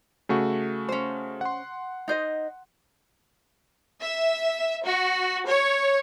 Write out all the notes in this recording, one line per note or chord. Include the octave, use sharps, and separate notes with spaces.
C#3 A3 F#4
C#4 C5
F#5 C6
D#4 C5 D#5
E5
F#4
C#5